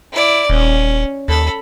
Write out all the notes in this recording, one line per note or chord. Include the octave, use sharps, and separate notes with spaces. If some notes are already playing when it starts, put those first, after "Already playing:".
E4 D5
D#1 C#4
D#2 A4 B5